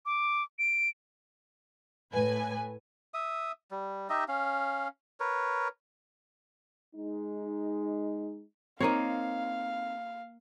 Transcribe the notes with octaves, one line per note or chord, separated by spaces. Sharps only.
D6
D7
A2 B4 G#5
E5 D#6
G3
D#4 G4 D#5 E5
C#4 F5
A#4 B4 C#5
G#3 D#4
A#3 C4 D#4 C#5 F5